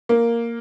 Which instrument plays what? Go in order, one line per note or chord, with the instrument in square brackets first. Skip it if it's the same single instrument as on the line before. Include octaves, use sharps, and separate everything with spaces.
[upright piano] A#3